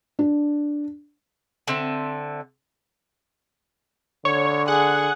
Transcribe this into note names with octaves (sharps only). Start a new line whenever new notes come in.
D4
D3 C4 E5
D3 C#5
G#4 F#5